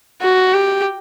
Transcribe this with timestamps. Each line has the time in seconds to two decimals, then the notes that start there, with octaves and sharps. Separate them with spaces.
0.22 F#4
0.54 G4